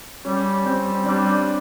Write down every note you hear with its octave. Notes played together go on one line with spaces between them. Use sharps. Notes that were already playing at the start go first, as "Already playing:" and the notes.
G3 C#4
G3 C4
G3 D4